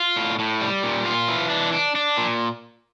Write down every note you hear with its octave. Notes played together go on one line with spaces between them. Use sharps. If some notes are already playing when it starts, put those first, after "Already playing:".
Already playing: F4
A2
A2
G3
A#2
F4
E3
D4
D4
D4
A#2